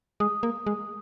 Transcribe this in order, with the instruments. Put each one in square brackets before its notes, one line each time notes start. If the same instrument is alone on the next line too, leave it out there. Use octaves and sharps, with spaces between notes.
[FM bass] G#3 [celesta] D#6
[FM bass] A#3
G#3